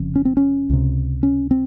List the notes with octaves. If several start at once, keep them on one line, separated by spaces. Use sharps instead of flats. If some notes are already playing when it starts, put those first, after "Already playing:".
Already playing: F1 F2 C#3
C#4
C4
C#4
C#2 C3
C#4
C4